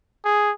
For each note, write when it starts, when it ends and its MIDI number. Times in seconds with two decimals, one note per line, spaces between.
0.25 0.52 68